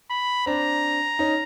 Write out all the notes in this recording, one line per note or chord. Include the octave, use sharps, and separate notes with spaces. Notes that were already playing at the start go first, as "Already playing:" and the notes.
B5
C4 D4 A#5
C#4 D#4